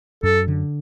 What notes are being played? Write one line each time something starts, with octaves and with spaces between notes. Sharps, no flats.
F#2 A4
D3